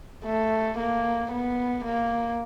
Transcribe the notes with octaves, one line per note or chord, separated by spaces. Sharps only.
A3
A#3
B3
A#3